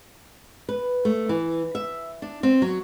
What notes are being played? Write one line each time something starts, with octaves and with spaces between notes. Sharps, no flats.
B4
A3
E3
E5
D4
C4
F#3